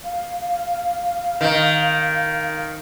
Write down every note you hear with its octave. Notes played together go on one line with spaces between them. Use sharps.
F5
D#3